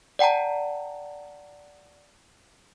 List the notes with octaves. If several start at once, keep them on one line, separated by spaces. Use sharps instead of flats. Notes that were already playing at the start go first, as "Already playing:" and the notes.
D5 F#5 G5 A5 A#5